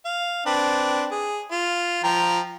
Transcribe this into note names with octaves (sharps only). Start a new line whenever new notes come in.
F5
C4 D4 B4
G#4
F4
F3 G5 A#5